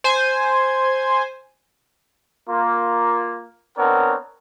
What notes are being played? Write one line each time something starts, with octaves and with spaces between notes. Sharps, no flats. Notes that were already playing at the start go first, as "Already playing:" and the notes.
C5 G#5
A#3 F4
B3 C4 D4 A#4 C#5 F#5